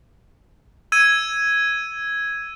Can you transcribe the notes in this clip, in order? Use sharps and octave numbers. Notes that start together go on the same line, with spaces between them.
E6 G#6 D#7